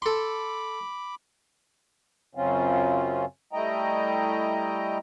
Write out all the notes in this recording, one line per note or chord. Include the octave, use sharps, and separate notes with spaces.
A4 B5 C6 D6
F#2 C#3 F#3 C4 C#4 F4
G3 A3 E4 D#5 G5 A#5